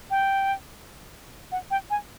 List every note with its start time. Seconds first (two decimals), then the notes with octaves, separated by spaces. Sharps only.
0.11 G5
1.52 F#5
1.71 G5
1.90 G#5